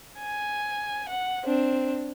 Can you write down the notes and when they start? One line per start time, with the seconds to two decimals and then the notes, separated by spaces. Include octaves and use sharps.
0.19 G#5
1.09 F#5
1.44 C4 D4